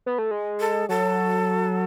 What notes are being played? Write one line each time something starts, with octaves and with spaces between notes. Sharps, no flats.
B3
A3
G#3
A4
F#3 A4